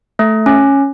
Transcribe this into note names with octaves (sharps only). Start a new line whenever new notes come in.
A3
C#4